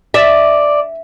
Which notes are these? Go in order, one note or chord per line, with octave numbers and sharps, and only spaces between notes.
D5 E5